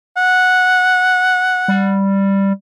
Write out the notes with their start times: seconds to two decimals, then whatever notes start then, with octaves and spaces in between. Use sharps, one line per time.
0.17 F#5
1.68 G3